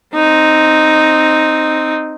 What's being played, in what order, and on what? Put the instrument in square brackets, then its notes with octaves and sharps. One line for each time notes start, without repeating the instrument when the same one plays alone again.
[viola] C4 D#4